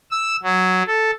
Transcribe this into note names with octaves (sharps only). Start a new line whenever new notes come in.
E6
F#3
A4